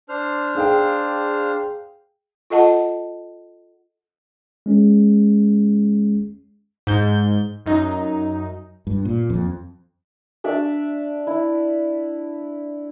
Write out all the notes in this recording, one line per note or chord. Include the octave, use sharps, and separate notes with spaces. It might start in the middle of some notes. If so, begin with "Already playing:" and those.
D4 C5 F6
G#4 F5 G5
F4 A4 D#5 F#5 A5
G#3 C#4 G#4
G#2 G6
F#2 D#4
G2
A#2
F2
D4 D5 E5
E4